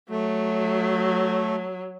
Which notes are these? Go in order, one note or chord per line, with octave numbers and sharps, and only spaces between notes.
F#3 A3